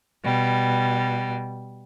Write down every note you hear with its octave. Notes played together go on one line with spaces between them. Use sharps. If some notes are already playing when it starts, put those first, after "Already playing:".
B2 G3